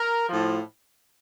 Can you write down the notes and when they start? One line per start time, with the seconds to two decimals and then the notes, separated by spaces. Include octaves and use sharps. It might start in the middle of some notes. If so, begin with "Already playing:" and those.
Already playing: A#4
0.29 A2 F3